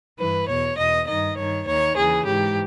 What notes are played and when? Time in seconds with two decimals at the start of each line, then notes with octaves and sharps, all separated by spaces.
0.19 G2 E3 B4
0.48 E2 B2 C#5
0.78 E2 B2 D#5
1.07 G2 D#3 D#5
1.37 G2 D#3 C#5
1.67 D#2 D#3 C#5
1.96 D#2 C#3 E3 G#4
2.26 G#2 E3 G4